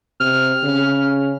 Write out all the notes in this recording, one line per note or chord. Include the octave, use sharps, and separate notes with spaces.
C3 F6
C#3